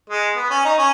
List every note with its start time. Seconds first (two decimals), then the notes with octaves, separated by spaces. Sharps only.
0.10 G#3
0.36 B3
0.50 C#4
0.65 D#4
0.78 C#4